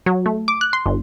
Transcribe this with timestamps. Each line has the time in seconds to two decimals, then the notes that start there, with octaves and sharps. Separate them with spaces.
0.06 F#3
0.26 A3
0.48 D6
0.61 F#6
0.73 C6
0.86 G1